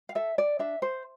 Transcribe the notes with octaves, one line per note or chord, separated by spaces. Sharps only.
F5
A4 E5
D5
D4 E5
C5